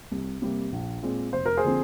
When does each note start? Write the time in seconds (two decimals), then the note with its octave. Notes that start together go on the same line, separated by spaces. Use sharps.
0.11 C2
0.42 C3 G3 A#3
0.72 A#1
1.02 A#2 G#3 C4
1.33 F1 C5
1.46 A#4
1.57 G#4 C5
1.64 D3 F3 C4